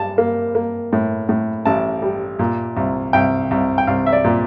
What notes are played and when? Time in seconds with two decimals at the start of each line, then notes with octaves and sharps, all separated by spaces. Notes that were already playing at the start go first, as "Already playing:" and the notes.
Already playing: G3 A5
0.18 A#3
0.55 A#3
0.92 A2
1.29 A2
1.65 A1 A5
2.02 G3
2.39 A#2
2.77 C2
3.13 C2 G5
3.51 C2
3.78 G5
3.87 C2 F5
4.06 E5
4.13 D5
4.24 A#2